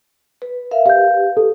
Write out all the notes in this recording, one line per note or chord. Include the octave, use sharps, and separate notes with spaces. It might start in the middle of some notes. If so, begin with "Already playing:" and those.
B4
A#4 E5 F5
G4 B4 F5 G6
A4